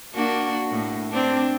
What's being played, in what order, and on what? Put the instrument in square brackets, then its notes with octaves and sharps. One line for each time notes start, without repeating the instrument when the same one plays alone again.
[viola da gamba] A#3 D4 F#4
A2
C4 D4